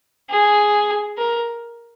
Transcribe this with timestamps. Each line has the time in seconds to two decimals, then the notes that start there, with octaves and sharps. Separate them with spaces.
0.30 G#4
1.18 A#4